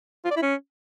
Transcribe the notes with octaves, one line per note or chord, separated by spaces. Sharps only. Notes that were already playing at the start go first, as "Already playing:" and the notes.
F4
D5
E4
C#4